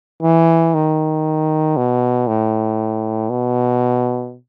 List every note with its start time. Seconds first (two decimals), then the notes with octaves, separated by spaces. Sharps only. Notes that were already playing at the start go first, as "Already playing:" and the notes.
0.23 E3
0.74 D#3
1.77 B2
2.28 A2
3.30 B2